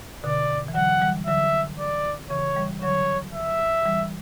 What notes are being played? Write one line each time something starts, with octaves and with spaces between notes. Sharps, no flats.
B2 D3 D5
E3
D3 F#3 F#5
E3 G3
D3 F#3 E5
D5
C#3 E3 C#5
E3 G3
D3 F#3 C#5
E5
E3 G3